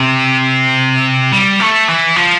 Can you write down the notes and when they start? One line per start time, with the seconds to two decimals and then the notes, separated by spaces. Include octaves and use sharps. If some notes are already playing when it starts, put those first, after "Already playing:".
Already playing: C3
1.32 G3
1.60 A3
1.88 E3
2.16 F3